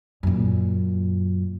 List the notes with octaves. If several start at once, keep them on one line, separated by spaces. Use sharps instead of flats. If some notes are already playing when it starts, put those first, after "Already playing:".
F#2 A#2